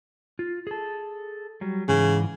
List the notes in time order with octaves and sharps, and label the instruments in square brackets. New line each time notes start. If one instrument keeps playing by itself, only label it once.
[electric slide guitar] F4
G#4 A4
F#3 G3
[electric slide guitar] G#2 E3 [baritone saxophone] C#3